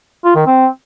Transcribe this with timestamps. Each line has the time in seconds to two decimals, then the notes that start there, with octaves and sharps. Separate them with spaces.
0.24 F4
0.35 D#3
0.46 C4